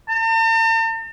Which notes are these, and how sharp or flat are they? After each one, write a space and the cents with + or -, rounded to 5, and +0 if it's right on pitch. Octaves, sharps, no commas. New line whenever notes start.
A5 +45